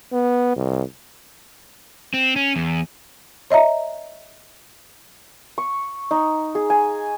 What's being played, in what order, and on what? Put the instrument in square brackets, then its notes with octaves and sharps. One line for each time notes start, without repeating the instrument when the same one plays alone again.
[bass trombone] B3
C2
[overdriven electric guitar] C4
C#4
E2
[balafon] C#5 D#5 E5 A#5
[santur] C#6
D#4
G#4
G#5